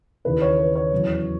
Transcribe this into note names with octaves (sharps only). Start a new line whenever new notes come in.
D#2 C#3 E3 B4
C#5
B4
C#5
E2 C#3 F#3